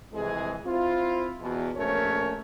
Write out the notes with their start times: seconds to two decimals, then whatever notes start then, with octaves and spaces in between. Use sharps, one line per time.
0.13 C2 F2 E3 G#3 G#4
0.66 C4 E4 F4
1.41 E2 B2
1.76 A#1 A3 C#4 A#4 C#5